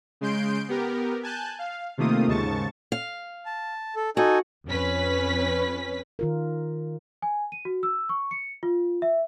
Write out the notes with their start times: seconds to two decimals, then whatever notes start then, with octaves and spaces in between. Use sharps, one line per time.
0.21 C#3 G#3 C6 G6 D7
0.68 B3 G4 A#4
1.23 G#5 A5 F#6 G6
1.59 F5
1.98 C3 D#3 A3 A#3 F4 D#6
2.27 D#2 G#2 C#3 A5 C#6 A6
2.92 F5
3.46 A5
3.96 A4
4.17 D#4 F#4 A4 G#5
4.67 F2 C#4 B4 B6
6.19 D#3 F4 A#4
7.22 G#5
7.52 D#7
7.65 F#4
7.83 E6
8.09 C#6
8.31 C#7
8.63 F4
9.02 E5